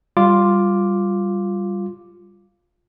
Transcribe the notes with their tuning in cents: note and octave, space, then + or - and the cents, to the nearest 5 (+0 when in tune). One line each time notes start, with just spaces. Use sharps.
G3 +0 F4 +0 D6 +0